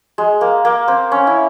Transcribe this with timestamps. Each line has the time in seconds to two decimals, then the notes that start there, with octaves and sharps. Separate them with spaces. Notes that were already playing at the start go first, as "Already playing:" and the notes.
0.18 G#3
0.41 A#3
0.65 A#3
0.88 C4
1.12 C#4
1.27 E4